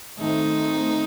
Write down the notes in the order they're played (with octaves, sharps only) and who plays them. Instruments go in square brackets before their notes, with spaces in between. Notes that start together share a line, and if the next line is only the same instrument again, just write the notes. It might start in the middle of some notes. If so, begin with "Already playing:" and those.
[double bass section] D#3 A3 C4 [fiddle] D#4